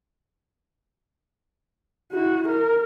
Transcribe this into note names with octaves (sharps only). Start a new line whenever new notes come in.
E4 F#4
A#4